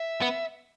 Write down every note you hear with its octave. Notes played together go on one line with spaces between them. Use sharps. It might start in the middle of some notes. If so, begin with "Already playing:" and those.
Already playing: E5
B3